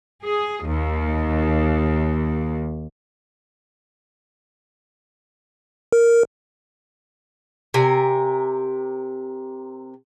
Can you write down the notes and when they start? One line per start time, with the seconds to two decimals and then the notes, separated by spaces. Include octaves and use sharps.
0.24 G#4
0.66 D#2
5.92 A#4
7.74 C3 A#4 G#5